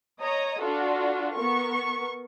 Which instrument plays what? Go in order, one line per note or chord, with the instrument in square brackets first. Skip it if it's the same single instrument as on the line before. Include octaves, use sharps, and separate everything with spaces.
[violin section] C#5 D#5 A#5 D#6
D4 F4 F#4 A4
B3 A#4 C#6